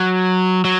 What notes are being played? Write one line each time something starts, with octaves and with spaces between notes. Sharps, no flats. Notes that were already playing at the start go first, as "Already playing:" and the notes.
Already playing: F#3
F#3